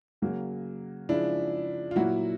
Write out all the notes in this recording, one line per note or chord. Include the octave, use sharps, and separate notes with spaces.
C#3 F#3 A#3
C#3 F3 G#3 D4 E4
F4
A#2 F#3 A#3 E4 F#4